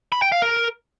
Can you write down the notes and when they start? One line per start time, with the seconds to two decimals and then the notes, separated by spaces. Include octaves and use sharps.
0.12 B5
0.22 G5
0.32 F5
0.42 A#4